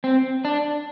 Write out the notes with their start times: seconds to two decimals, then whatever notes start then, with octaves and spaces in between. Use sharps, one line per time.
0.04 C4
0.45 D4